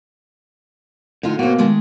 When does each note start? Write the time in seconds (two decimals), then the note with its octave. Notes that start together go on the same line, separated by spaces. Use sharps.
1.23 A2 D3 D#4 F4
1.39 B2 A#3 C4 F#4
1.58 D#3 G#3 A3